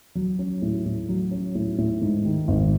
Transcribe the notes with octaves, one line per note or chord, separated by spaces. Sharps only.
F#3
C#4
A2
A2
F#3
C#4
A2
A2
G#2
D#3
G#1